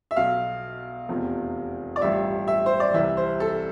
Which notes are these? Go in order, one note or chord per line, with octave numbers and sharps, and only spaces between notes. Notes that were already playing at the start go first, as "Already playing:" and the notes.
E5
B1 B2 F5
F1 E2 C3 F3
D5
A1 G2 F3 E5
E5
C5
D5
C2 C3 E3 E5
C5
A4